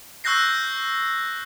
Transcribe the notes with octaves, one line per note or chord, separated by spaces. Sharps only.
C#6 E6 F#6 G6 A#6 C7